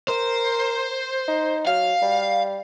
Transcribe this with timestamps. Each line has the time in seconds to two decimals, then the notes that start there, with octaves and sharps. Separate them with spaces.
0.08 A#4 C5
1.28 D#4
1.67 F#3 F5
2.02 G3